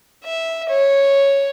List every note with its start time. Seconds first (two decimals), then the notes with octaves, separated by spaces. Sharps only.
0.24 E5
0.69 C#5